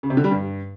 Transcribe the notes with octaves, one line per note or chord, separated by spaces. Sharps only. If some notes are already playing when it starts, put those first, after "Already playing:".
C#3
C3
D3
G3
G2